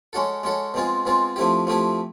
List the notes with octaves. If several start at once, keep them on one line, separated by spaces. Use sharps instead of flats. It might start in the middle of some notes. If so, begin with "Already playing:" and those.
G#3 C#4 F#4 A4
G#3 C#4 F#4 A4
B2 G#3 C4 F4 G#4
B2 G#3 C4 F4 G#4
F3 A3 C4 E4 G4
F3 A3 C4 E4 G4